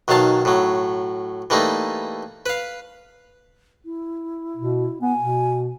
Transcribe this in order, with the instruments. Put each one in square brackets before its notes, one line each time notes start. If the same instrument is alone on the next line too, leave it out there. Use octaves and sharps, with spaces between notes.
[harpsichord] B1 D#3 F#3 F5 A5
A2 F#3
E3 G3 A3 A#3 D#4
B4 F5
[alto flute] E4
[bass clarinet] B2
[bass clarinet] B3 [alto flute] G#5
[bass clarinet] B2